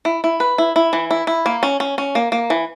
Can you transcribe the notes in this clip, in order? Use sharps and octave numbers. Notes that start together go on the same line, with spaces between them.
E4
E4
B4
E4
E4
E3
E4
E4
A#3
C#4
C#4
C#4
A#3
A#3
E3